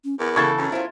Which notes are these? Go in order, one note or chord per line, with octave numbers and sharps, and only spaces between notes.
C#4
E2 A#4
C#3 E3 A4 C#6 G#6 A6
F#2 C#4
E4 F4 C5